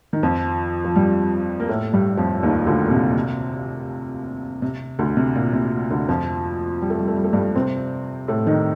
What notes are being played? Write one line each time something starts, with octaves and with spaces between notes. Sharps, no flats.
D#3
F2 F3
F3
G2 G3
A#3
A2 A3
G2 G3
F2 F3
D#2 D#3
D2 D3
A#2
C3
C3
D2 D3
C3
A#2
C3
D2 D3
F2 F3
G3
A3
G3
A3
G3
A3
G2 G3
C3 C4
A2 A3
D#3 D#4